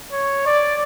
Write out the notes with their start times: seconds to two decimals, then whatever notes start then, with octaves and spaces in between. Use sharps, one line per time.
0.13 C#5
0.46 D5